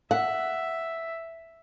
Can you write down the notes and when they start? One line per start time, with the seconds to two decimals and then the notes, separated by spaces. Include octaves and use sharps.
0.11 E5 F#5